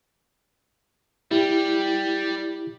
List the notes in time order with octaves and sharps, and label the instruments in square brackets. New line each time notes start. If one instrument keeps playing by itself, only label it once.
[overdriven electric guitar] G3 [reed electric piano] E4 G4